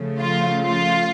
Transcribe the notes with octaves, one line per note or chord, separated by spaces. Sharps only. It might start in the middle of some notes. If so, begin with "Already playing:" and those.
Already playing: C#3 F3 A3
F4
F4